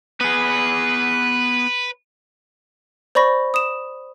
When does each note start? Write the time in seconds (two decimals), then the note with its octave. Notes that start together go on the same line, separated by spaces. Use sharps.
0.21 B3 G#4 B4
3.15 C5 D5 B5 C#6 A#6
3.54 D#6 E7